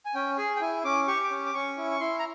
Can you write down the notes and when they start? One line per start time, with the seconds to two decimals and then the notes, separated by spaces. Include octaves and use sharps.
0.05 G#5
0.15 C#4 G5
0.38 G#4 G#5
0.56 G5
0.61 E4 G#5
0.84 C#4 D6
1.07 G4 C#6
1.24 D6
1.31 C#4
1.46 D6
1.54 C#4 C#6
1.77 E4
1.91 C#6
2.00 E4 C6
2.19 A#5